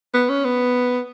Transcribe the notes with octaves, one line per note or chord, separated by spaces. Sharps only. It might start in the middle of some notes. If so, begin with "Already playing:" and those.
B3
C#4
B3